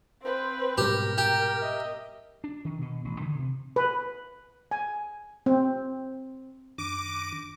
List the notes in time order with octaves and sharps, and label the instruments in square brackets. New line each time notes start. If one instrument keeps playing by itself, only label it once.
[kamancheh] C4 B4 [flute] C5
[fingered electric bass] G#2 B2 G3 [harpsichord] G4 [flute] A#4
[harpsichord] G4 [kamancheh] G5
[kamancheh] D#5 E5
[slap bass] D4
D#3
B2
A1
D3
C3
[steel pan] B4
G#5
C4
[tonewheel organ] F#2 D#3 D4 [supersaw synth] D6